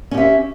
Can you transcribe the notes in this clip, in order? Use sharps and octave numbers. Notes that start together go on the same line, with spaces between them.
C#4 G4 E5